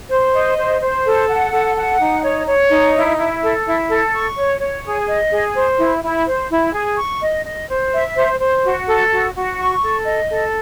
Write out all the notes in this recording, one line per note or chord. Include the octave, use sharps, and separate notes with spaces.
C5
D#5
C5
C5
A4
F#5
A4
F#5
D#4
C#5
C#5
D#4
E4
E4
A4
E4
A4
C#6
C#5
C#5
G#4
D#5
G#4
C5
E4
E4
C5
E4
G#4
C#6
D#5
D#5
C5
E5
C5
C5
F#4
A4
F#4
F#4
C#6
A4
D#5
A4